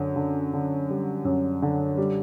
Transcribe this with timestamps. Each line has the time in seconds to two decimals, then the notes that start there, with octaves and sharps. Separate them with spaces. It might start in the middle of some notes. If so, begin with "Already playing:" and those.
Already playing: F#2 D3
0.16 D3
0.53 D3
0.90 G3
1.25 F#2
1.62 D3
1.97 G3